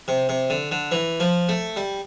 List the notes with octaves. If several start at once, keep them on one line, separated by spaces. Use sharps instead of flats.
C3
C3
D3
D3
E3
F3
A3
G3